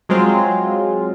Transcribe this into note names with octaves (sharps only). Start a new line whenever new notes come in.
F#3 G#3 C4 F4